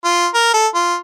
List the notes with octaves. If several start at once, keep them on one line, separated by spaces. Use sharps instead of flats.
F4
A#4
A4
F4